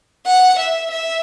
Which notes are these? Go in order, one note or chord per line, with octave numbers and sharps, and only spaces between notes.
F#5
E5
E5